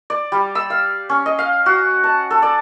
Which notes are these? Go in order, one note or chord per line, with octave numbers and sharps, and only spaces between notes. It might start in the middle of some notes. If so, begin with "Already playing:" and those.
D5
G3
E6
F5
C#4
D#5
F5
F#4
A5
A4
D5